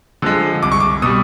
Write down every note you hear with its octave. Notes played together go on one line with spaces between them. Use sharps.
D3 F3 G#3
C2 D6
C#6
D6
B2 G3 D#6